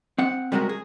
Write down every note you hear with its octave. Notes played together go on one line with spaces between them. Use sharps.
C4 F#5
C3 G3 G#3 F#4 A4 A#4
G#4